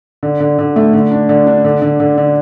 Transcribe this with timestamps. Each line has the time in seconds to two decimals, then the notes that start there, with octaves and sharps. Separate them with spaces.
0.23 D3
0.40 D3
0.58 D3
0.76 A3
0.93 D3
1.11 D4
1.29 D3
1.47 D4
1.64 D3
1.82 D3
2.00 D3
2.18 D3